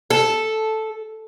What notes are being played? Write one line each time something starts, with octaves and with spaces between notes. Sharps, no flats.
A4